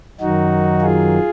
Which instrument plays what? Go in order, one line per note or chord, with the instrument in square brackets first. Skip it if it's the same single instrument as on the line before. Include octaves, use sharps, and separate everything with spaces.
[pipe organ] F#2 D#3 F#3 D#4 F#4
F4 G#4